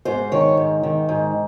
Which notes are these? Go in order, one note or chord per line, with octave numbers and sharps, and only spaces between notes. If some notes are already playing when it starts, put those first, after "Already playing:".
G#2 C5
D#3 C#5
G#2
D#3
G#2